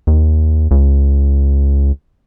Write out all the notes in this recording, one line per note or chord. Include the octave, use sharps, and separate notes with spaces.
D#2
C#2